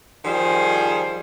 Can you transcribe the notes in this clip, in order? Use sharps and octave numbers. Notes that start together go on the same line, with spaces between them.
D#3 F3 G3 G#4 C5